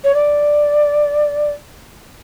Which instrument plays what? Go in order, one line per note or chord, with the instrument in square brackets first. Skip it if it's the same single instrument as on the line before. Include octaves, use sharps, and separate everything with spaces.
[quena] C#5
D5